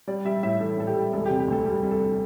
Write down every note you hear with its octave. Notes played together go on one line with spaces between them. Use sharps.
G3 D5
G3 E5
A2 E5
E3 A4
A2 A4
G4
G3
E1 A4
C3 G4
G4
D2 A4
G3 G4
G3
A4